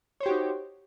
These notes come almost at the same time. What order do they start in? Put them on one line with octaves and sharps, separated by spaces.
C#5 C5 G4 F#4 D#4